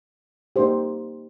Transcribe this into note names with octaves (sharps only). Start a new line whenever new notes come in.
A#3 D#4 G4 C5